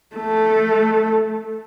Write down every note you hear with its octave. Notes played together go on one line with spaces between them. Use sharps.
A3 A4